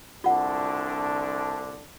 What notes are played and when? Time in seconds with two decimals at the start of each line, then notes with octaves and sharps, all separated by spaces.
0.24 C2 D3 D4 F4 F#5